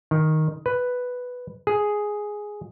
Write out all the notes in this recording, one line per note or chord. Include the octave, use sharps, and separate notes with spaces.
D#3
B4
G#4